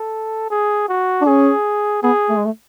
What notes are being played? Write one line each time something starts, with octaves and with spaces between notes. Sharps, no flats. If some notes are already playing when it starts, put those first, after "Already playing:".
Already playing: A4
G#4
F#4
D4
C#4 G#4
B3 G#4
A3
G#3
A3